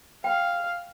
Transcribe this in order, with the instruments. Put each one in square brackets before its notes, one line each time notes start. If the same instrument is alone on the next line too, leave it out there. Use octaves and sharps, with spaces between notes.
[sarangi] F5 [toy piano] G5